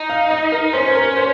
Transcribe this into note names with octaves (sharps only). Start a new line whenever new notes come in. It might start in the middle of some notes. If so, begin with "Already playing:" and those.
Already playing: D#4
F5
D#5
A#4
C#4 C5
C5
A#4
C5